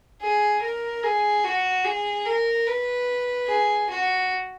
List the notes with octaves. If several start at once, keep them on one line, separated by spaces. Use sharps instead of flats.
G#4
A#4
G#4
F#4
G#4
A#4
B4
G#4
F#4